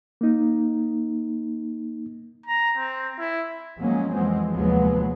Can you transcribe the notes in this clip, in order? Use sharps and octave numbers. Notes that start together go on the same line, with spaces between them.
A#3 D#4
A#5
C4
E4
F3 F#3 G#3 A#3 C#4
F2 E3 F#3 G#3 C4
F1 D#2 F3 F#3 G#3 B3